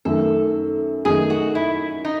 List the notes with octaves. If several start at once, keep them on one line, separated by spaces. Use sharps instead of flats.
F#2 D#3 A3 A4
F#2 D#3 A3 D#4 G#4
F#4
E4
D#4